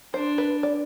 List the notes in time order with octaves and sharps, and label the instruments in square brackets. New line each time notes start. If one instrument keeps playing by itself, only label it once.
[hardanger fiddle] D4 [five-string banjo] C5
[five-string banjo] B4
D5